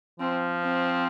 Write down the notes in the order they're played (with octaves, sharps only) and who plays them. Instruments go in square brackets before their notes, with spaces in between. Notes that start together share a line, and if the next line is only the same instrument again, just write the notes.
[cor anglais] F3 [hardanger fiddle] C4
[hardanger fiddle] C4